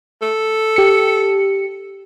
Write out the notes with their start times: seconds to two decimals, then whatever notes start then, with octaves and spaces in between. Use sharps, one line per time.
0.22 A4
0.76 G4 C#7